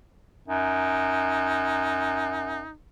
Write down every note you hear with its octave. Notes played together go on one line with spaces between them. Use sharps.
F#2 D#4